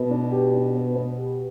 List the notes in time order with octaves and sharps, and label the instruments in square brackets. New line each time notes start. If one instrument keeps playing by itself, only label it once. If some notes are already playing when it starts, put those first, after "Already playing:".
Already playing: [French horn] B2 [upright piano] B3
[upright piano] D4
G4
D4
B3
B3
G4